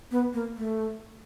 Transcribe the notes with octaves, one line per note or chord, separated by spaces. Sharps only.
B3
A#3
A3